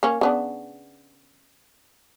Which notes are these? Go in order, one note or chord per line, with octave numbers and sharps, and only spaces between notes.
A#3 C#4
C#3 B3 D4